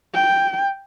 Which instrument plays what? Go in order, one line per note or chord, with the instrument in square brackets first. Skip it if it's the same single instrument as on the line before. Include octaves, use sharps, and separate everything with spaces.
[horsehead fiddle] G5